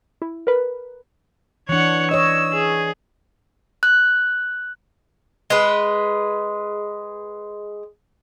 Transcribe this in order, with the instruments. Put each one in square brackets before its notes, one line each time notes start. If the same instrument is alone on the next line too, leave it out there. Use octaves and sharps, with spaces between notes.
[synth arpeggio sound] E4
A#4 B4
[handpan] E3 D4 [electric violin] C#5 F#5
[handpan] C#5 D#5 [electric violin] E6
[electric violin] G#4
[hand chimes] F#6
[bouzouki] G#3 B4